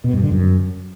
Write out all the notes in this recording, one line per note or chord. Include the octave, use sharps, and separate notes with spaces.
B2
G2
D3
F#2